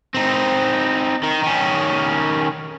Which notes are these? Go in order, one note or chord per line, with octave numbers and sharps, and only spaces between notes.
C4 D#4
D#3
D#3 C#4